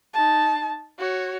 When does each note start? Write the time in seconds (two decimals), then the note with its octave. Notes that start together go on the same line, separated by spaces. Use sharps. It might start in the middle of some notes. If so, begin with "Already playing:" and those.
0.14 D#4 A5
0.99 F#4 C#5